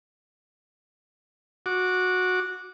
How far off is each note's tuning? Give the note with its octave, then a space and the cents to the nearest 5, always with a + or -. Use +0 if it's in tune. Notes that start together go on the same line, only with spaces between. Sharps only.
F#4 -15 D6 -5